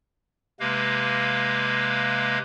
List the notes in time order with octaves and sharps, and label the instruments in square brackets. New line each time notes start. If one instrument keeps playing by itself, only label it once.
[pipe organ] C3 G#3 A#3 B4 F5